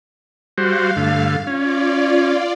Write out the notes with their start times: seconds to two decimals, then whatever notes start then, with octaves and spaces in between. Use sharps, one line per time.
0.58 G3 F#4 C5 F5
0.97 G2 D3 A3
1.47 C#4 F4 D5